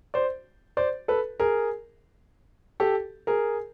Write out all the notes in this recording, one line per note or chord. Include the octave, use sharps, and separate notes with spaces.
C5 D5
C5 D5
A4 B4
G#4 A#4
G4 A4
G#4 A#4